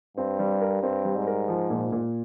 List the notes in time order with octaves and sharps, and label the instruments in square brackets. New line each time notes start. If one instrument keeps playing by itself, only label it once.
[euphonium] G2 [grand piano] C4
[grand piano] G3
A#4
[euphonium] G2 [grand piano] C4
[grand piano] G3
[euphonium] G#2
[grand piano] A#4
F3
A#2
A#2